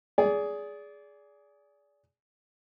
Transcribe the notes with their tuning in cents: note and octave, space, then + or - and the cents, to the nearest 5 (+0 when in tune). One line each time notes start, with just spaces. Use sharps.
G#4 +5 D5 -25